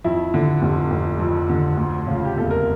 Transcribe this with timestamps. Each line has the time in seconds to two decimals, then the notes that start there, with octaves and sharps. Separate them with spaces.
0.04 F2 E4
0.34 D3
0.62 F1
0.91 F1
1.19 F2
1.49 D3
1.77 D2
2.07 C#3 F4
2.25 G4
2.36 E1 A4
2.51 A#4